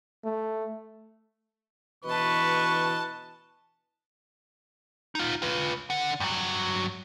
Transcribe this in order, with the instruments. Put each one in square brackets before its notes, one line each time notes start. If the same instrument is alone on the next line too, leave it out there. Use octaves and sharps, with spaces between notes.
[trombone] A3
[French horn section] D2 B2 E3 [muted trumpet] B4 [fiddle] D#5 A5 [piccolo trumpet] C#6
[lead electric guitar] D#4 F4
F4 B4
D3 F#5
G2 F#3